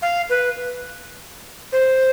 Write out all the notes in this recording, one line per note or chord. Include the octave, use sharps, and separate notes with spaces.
F5
B4
C5